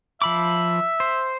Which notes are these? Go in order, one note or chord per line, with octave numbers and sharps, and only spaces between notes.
F3 E5 B5 D6
C5